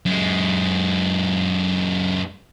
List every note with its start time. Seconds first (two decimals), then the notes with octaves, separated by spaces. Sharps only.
0.06 F#2 G#3